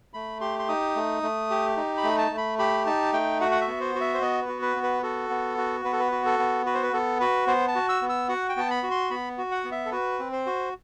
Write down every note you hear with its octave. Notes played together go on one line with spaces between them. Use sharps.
A3 B5
G4 C6
C6
D#4 D#6
A3
A3
G4
D#4
B5
A3
A5
A3
B5
G4 B5
D#4 A5
A3 G5
F#4 F#5
F#5
E5
B3
C5
F#4
E5
C5
B3 D#5
B4
F#4
B4
B3
B4
F#4 A4
B3
F#4
B3 B4
A4
B4
F#4
A4
B3
F#4 B4
C5
B4
B3 A4
F#4 B4
B3 C5
A5
F#4
E6
B3
E6
F#4 F#5
G5
B3 A5
B5
F#4
C6
B3 B5
F#4
F#5
B3
E5
A4
F#4 B4
C4
C5
F#4